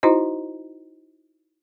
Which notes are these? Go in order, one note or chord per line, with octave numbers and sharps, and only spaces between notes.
D#4 E4 F#4 C5 D#5 A#5